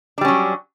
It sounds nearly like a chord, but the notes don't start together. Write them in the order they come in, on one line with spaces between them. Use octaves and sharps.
D4 G3 C#4 F#3